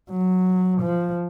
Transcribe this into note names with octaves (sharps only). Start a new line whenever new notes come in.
F#3
F3